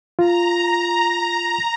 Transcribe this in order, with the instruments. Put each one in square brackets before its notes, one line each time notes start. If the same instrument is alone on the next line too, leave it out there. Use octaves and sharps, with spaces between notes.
[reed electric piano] F4 [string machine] A#5